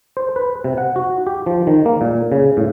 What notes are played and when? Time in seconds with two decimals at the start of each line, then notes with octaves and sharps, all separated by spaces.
0.17 C5
0.36 B4
0.64 C3
0.78 F#5
0.96 F#4
1.27 G4
1.46 F3
1.67 D#3
1.86 A#3
2.01 A#2
2.32 C#3
2.57 A2